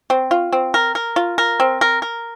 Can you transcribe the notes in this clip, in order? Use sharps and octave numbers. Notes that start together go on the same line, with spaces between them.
C4
F4
C4
A#4
A#4
F4
A#4
C4
A#4
A#4